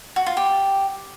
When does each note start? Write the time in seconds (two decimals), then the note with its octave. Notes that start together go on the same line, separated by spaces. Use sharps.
0.16 F#4
0.26 F4
0.37 G4